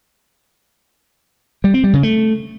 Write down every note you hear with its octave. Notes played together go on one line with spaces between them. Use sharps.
G3
C4
G3
C#3
A3